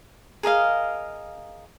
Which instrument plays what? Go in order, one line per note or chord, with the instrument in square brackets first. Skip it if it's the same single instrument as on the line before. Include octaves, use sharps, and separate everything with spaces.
[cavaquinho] G#4 A#4 D#5 F5